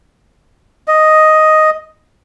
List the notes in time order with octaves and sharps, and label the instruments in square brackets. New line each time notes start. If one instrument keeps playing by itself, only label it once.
[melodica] D#5